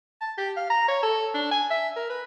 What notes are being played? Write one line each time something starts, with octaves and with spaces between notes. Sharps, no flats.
A5
G4
F5
A#5
C#5
A4
D4
G#5
E5
A#4
B4